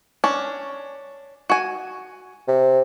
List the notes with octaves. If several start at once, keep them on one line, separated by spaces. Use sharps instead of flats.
C#4 D4
F#4 G#5
C3